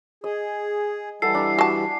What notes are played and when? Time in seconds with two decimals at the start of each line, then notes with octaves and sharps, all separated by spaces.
0.24 G#4 D#5
1.22 E3 G3 E4 A4 F#5 G#5 C7
1.35 D4 A#5
1.59 F#4 A5